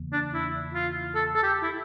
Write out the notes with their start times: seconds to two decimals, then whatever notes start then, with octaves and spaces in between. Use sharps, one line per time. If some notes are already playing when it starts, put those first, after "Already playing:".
Already playing: E2 C#3 E3 A#3
0.13 D4
0.34 E4
0.75 F4
1.15 A4
1.35 A4
1.43 G4
1.62 E4